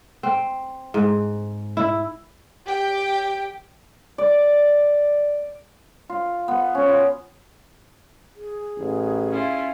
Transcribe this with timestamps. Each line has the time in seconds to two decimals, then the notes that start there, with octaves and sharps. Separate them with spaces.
0.23 C4
0.94 G#2
1.77 E4
2.66 G4 G5
4.18 D5
6.09 F4
6.48 B3
6.75 C#4
6.88 F4
8.36 G#4
8.77 A1
9.29 C#4 E4 F4